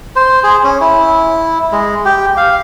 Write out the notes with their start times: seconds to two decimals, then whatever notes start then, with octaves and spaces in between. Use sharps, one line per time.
0.16 C5
0.44 G#4
0.64 C#4
0.81 E4
1.72 G#3
2.05 G4
2.37 F5